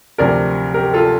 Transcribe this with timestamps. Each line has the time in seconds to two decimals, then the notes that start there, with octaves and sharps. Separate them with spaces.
0.18 D2 C3 F3 A#4 D5
0.74 G4 A#4
0.93 F4 A4